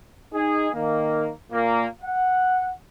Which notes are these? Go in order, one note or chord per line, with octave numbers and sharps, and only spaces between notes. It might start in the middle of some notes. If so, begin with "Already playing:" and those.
D#4 G#4
D#3 A#3
A#2 A#3
F#5